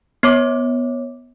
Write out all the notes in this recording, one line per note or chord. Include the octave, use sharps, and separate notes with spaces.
B3 C#5 D6